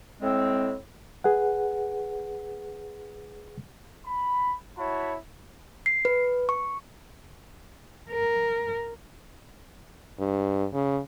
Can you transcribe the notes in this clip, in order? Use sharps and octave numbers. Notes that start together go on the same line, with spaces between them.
A2 G#3 C4
G#4 B4 F#5
B5
E4 F#4 C#5 A5 B5
C7
B4
C#6
A#4
G2
C#3